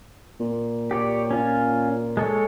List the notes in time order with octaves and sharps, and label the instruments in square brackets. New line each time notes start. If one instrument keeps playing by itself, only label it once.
[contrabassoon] A#2
[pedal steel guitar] G4 C#5 D5
C#4 F4
G#3 A4 C#5